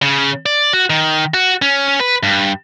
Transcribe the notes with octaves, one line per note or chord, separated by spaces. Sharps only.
C#3
D5
F#4
D#3
F#4
C#4
B4
G2